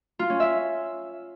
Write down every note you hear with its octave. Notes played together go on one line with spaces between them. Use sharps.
F4
C#4
E5